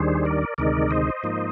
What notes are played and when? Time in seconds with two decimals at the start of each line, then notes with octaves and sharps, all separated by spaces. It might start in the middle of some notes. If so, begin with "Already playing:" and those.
Already playing: D#2 D#3 G3 D4 G#4 C5
0.25 A#4 D5
0.58 D2 C3 D#3 G#3 D#4 A#4 D5
0.90 C5 D#5
1.23 G#2 F3 A#3 D#4